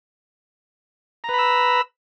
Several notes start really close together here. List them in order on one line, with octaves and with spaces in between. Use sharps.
A#5 B4 B5 E6